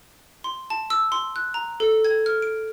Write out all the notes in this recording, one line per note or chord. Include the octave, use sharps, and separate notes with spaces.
C6
A5
E6
C6
F#6
A#5
A4
G#6
F6
D7